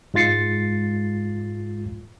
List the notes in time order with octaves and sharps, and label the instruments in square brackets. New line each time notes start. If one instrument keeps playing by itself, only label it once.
[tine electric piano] G#2 G#3 F4 A6 C7 C#7